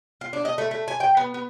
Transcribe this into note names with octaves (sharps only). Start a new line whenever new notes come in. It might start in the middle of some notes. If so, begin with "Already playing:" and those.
F4
D4
D#5
A3
A3
G#5
G5
B3
B3